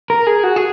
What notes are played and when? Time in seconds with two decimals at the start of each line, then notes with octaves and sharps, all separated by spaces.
0.10 A#4
0.27 G#4
0.44 F#4
0.56 G#4